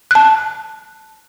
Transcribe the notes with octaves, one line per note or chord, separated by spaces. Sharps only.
A5 F#6